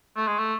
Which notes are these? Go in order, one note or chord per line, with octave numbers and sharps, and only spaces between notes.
A3
G#3
A3